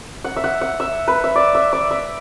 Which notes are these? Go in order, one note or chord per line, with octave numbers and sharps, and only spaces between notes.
F#5
E5
F#5
F#5
E5
B4
E5
D5
E5
D5
E5